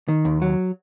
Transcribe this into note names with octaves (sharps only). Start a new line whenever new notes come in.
D#3
D#2
F#3